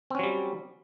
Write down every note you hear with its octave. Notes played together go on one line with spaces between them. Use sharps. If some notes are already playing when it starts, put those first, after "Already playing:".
F#3 G3 C4 C#4